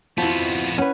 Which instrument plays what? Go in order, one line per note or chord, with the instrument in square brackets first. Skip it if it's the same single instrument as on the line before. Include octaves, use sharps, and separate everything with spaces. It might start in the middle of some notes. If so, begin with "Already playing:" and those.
[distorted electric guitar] F2 B3 [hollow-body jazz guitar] F3 [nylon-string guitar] E4 F#4
[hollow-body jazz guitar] C#4 B4 [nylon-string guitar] F#5